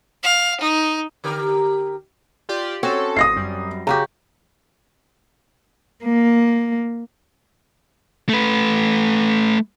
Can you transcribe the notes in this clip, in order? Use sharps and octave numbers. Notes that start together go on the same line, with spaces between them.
F5
D#4
D3 G4 A#4
F4 G4 D5
C4 C#4 F#4 A4
G1 D#6 A#6 C7
F#2 G3
C#3 F#4 G4 A#5
A#3
A3 B4